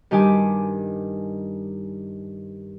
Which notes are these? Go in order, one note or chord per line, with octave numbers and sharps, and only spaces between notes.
G2 D#3 G3 G4 G#5 D6